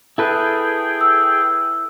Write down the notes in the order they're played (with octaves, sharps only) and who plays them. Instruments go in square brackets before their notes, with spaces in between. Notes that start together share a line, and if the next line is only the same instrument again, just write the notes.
[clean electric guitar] E4 A4 B4 [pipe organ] G#4 G5
[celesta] E6